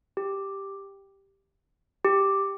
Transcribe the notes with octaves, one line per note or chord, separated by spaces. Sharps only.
G4
G4